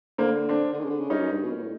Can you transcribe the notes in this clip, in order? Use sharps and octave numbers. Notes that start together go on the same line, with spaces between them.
D3 A#3 C4
C4 D4
D3
D#3
C#3
D3
C#3
G2 C#4 D#4
F#2
G2
B2
A#2
A2